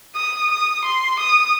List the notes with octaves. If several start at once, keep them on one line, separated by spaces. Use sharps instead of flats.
D#6
D#6
C6
D#6